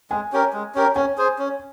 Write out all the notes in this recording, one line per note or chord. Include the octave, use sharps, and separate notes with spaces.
G#3 G#5
C#4 G4 A#4
G#3
C#4 G4 A#4
C#4 G#5
G#4 C5
C#4